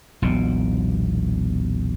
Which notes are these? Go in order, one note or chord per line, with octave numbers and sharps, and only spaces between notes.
E1 B1 A#2